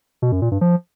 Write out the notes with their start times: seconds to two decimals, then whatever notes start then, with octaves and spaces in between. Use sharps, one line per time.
0.22 B2
0.32 F#2
0.42 A#2
0.51 G2
0.61 F3